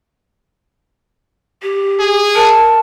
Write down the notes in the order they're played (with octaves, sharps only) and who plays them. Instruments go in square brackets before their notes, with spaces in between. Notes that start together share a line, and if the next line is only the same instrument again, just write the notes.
[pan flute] G4
[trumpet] G#4
[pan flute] A#4 [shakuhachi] A5